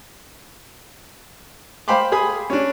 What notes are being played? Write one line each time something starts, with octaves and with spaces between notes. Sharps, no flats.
C5 F5 G5 B5 C6 D6
G#4 B5 D#6
C#4 D4